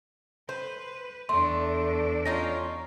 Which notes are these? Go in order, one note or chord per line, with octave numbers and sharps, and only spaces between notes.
B4 C5
E2 A3 D4 C6
C#4 D#4 F4 A#6